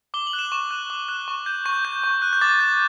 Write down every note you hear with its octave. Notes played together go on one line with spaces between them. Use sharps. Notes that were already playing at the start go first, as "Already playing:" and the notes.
D6 G7
F#7
F#6
E7
C#6 E7
F#6
D6
F#6
C#6
G6
C#6 G6
G6
C#6
F#6
G6
D6 A6
G6